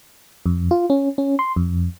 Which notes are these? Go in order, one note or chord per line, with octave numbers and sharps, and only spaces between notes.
F2
F4
C#4
C#4
C6
F2